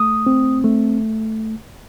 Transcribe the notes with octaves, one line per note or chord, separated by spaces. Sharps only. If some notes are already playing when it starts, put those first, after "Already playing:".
Already playing: A3 D#6
C4
A3